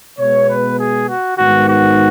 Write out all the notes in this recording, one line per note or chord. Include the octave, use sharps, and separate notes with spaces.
B2 G#3 B3 C#5
B4
G#4
F#4
G#2 D#3 B3 F#4
F#4